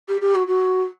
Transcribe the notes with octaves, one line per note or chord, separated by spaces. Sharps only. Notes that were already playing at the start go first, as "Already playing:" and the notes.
G4
G4
F#4
F#4